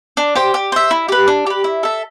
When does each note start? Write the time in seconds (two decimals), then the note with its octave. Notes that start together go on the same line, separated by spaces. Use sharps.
0.17 D4
0.35 G4 C5 G5
0.54 G4
0.72 C5 E5
0.91 E4
1.08 G4 B4
1.28 D4
1.46 G4 B4
1.64 E4
1.83 A4 E5